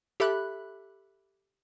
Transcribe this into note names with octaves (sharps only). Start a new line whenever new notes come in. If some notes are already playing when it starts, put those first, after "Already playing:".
G4 A4 E5 B5 F#6